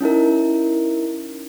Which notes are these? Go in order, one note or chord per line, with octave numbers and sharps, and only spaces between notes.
C#4 D#4 E4 A#4